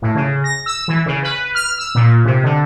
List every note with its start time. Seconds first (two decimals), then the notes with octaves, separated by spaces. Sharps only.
0.02 A2
0.15 C#3
0.44 A#6
0.66 E6
0.88 E3
1.06 C#3
1.23 B4
1.55 F6
1.78 E6
1.95 A#2
2.25 C3
2.44 D3